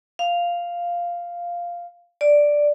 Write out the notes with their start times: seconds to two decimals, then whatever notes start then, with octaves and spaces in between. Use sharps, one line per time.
0.19 F5
2.21 D5